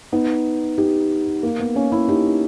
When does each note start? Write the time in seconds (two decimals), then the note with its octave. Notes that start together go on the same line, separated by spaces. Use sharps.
0.12 B3 D#4
0.78 D#4 G4
1.43 A#3
1.60 B3
1.76 A#3 C#4
1.92 C#4 E4
2.09 D#4 G4